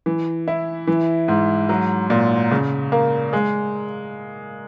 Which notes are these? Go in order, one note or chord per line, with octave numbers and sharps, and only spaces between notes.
E3
E4
E3
G#2
F#3
A#2
C#3
A#3
G#3